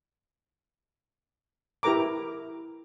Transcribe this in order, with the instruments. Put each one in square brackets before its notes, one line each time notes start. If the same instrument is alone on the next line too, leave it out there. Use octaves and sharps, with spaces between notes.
[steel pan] E4 G4 A#4 B4 A#5 D6